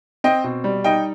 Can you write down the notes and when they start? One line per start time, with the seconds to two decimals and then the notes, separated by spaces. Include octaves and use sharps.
0.24 C4 D#5 G5
0.44 B2
0.64 G3
0.84 D#4 D#5 G5